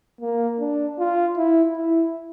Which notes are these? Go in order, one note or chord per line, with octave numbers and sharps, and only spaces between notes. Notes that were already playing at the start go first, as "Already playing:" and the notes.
A#3
D4
F4
E4
E4